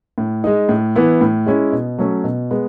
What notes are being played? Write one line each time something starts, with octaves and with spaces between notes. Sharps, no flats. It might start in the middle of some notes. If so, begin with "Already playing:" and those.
A2
G#3 D#4
A2
E3 B3 E4
A2
G#3 C#4 E4
B2
F#3 A3 C#4
B2
G#3 B3